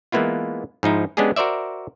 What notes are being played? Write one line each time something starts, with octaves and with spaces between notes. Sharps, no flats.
E3 G#3 A#3 B3 E4 F4
G#2 F3 D#4 E4
G#3 B3 C#4 D4 G4 G#4
F#4 A#4 C5 D5 E5